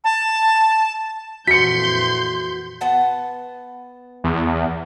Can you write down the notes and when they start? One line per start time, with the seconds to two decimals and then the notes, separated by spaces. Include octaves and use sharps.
0.04 A5
1.47 F2 A#2 E3 F#4 C6 G6 B6 C#7
2.81 B3 F#5 A5
4.24 E2